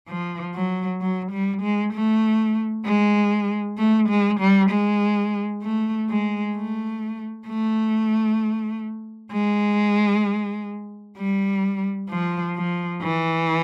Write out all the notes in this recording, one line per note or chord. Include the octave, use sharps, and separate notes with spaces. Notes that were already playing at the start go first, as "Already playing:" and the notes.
F3
F#3
F#3
G3
G#3
A3
G#3
A3
G#3
G3
G#3
A3
G#3
A3
A3
G#3
G3
F3
F3
E3